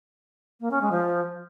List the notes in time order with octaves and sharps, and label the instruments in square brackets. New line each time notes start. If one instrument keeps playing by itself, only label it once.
[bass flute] A#3
C#4
G#3
F3